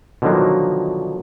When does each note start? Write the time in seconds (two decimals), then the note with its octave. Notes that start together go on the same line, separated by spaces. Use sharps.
0.22 B2 D3 D#3 F3 F#3 A#3